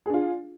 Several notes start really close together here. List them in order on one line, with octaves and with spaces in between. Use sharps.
G#4 D4 F4